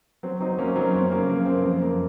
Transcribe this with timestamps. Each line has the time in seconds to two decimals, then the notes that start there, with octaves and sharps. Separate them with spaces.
0.23 F#3 C4
0.40 F#3 C4 D#4
0.58 F#3 A#3 C#4
0.76 F#3 C4 D#4
0.94 F#2 C4
1.11 C#3 A#3
1.28 F3 A#3
1.46 F#2 C4
1.64 F2 C4
1.81 F2 A#3